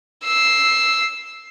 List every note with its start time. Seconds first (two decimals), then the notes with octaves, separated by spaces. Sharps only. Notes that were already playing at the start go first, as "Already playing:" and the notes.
0.24 E6 C7